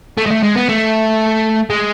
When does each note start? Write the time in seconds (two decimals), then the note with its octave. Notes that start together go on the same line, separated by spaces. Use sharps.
0.17 A3
0.26 G#3
0.31 A3
0.43 G#3
0.56 B3
0.69 A3
1.70 G#3